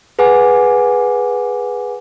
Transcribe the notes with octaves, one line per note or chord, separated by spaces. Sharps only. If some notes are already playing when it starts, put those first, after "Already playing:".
G#4 B4 F#5 G#5 D6